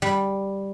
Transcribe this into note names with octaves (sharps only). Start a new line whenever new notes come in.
G3